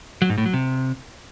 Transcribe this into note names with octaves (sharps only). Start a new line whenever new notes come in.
F#3
G#2
A2
F#3
C3